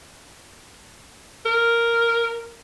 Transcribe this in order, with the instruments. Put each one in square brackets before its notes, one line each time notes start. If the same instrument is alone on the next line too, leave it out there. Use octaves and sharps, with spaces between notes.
[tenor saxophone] A#4